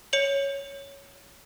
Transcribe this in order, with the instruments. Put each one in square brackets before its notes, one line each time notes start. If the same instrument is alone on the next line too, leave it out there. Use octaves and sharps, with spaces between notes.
[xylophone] C#5 C#7 F7 F#7